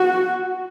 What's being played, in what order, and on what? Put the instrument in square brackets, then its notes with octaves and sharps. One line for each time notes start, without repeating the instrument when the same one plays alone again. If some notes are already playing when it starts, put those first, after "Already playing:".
Already playing: [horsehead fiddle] F#4